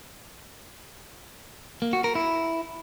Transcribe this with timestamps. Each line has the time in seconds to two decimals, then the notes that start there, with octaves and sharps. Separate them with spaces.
1.82 A#3
1.93 F#4
2.04 A#4
2.15 E4